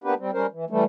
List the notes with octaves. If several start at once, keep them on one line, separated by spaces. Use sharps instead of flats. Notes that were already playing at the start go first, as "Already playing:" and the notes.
A#3 B3 D4 G4 B4
G3 C4
G3 C#4 A#4 C5
E3
E3 G3 A3